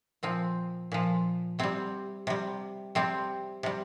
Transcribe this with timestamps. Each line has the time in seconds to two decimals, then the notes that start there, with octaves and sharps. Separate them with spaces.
0.23 A#2 F3 C4
0.92 A#2 F3
1.59 C3 G3 C4
2.27 C3 G3
2.95 C3 G3 C4
3.63 C3 G3